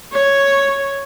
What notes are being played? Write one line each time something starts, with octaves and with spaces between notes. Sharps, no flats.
C#5